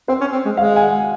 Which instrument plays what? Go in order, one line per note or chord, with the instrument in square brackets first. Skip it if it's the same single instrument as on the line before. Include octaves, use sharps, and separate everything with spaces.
[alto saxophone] C4 [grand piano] C5
[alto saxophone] C#4
C4
G#3
[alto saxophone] G#3 [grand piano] F5
[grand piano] G#5
F#5